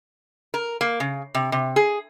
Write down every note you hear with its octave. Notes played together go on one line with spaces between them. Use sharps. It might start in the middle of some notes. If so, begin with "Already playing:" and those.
A#4
A#3
C#3
C3
C3
G#4